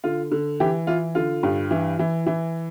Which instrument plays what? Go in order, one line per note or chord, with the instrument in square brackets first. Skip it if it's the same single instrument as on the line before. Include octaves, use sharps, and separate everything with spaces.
[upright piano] D3 F4
D3
E3 G4
E3 F4
D3 F4
G2
E3
E3
E3